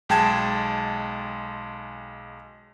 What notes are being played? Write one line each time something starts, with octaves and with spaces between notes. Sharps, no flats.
B1 G#3 G5 A5 G#6 E7